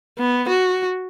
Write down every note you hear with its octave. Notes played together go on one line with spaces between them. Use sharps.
B3
F#4